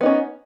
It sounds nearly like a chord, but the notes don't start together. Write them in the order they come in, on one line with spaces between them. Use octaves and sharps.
B3 D#4 C#4